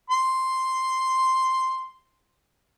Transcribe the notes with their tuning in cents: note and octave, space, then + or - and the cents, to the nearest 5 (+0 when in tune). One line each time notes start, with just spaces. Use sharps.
C6 +0